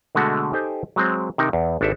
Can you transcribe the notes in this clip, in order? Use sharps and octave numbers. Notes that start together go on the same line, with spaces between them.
B2 D3 G#3 A3 F#4
D#4 G4 A4 C5 G5 G#5
F#3 G#3 C4
C3 D#3 D#4 A#4
E2
G#1 D4 G4 A4 E5